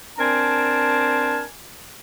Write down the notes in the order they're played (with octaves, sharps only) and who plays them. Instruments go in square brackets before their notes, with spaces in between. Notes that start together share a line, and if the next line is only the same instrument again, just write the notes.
[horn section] C4 D4 A#4 G#5 A5